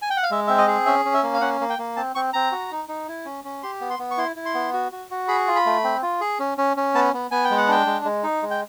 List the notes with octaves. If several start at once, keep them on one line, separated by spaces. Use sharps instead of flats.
G#5
G5
F#5
F5
G#3 E5
C4 E5
D#5
G#4
C#4 E5
C#4
E5
A#3
F5
C#4 F#5
A#3
G5
A#3
C4 A5
C4 C#6
C4 A#5
F#4
D#4
D#4
E4
C#4
C#4
G4 C6
B3
C6
B3
C#6
E4 C6
E4
C6
B3
F#4
F#4
F#4
G#4 B5
F4
B5
A3
C4
F4
G#4
C#4
C#4
C#4
B3 A5
B3
B3 G#5
G5
G#3
F#5
D4 G5
G#3
G#3
D#4
G#3
G5